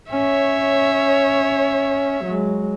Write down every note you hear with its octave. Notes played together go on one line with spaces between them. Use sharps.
C#4 C#5 E5
F#3 G#3